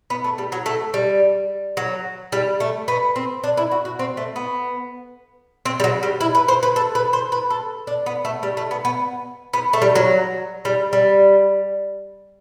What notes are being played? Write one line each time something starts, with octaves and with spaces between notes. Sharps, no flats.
B3
A3
G3
F#3
A3
G3
F#3
G3
A3
B3
C4
D4
E4
F#4
F#4
C4
A3
B3
C4
G3
F#3
G3
E4
B4
C5
B4
A4
B4
C5
B4
A4
D4
B3
A3
G3
A3
B3
B3
B3
A3
G3
F#3
G3
G3